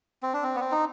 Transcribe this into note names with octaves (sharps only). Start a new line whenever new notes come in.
C4
D4
C4
B3
C4
D#4